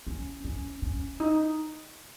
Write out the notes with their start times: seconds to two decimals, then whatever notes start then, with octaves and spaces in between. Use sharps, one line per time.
0.07 C#4
0.44 C#4
0.82 C#4
1.20 D#4